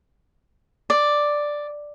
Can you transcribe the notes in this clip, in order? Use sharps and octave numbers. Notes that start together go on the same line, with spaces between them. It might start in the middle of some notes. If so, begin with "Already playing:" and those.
D5